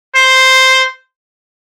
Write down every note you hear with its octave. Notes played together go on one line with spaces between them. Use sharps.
C5